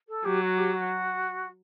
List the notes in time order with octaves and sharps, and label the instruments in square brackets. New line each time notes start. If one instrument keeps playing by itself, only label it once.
[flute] A4
[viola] F#3 [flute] G4
[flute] F#4
G4
F#4